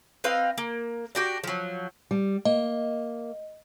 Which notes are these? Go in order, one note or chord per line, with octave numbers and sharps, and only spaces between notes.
C4 B4 D#5 F5
A#3
D4 F#4 G4
F3 F#3
G3
A#3 D#5